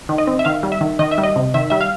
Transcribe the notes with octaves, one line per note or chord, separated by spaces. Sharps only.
D#3
D#5
C4
E5
D#3 F5
G3
E5
D#3
D#3 D#5
E5
G3
D#5
C3
D#3 E5
G3 E5
F5